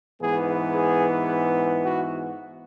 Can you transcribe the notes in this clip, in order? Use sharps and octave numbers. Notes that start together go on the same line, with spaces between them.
G#2 E3 B3 G#4
G#4
F#4